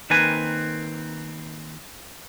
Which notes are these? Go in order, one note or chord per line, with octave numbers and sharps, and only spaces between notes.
D#3 A#3 C4 B4 G#5